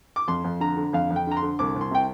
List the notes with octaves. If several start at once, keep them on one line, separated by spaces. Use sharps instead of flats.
D6
F2 C6
F2
D3 A#5
D3
F2 F5
F2
G5
D3 A#5
C6
D3
C2 D6
C2
C6
C3 G5